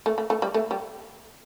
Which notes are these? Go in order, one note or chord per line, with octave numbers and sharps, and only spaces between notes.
A3
A3
A3
G3
A3
G3